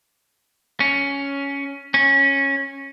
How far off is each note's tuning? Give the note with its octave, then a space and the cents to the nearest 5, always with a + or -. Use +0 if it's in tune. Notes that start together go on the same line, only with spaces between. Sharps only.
C#4 +10
C#4 -10